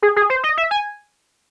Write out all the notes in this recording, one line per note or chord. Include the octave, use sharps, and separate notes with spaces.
G#4
G#4
C5
D#5
E5
G#5